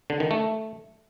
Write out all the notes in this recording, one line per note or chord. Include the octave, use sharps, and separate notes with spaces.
D3
D#3
A3